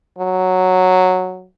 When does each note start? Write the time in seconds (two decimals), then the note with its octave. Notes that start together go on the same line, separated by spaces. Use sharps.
0.19 F#3